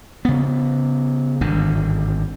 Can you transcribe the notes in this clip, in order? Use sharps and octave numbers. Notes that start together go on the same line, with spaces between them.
C#3 B3
G#1 G2 D3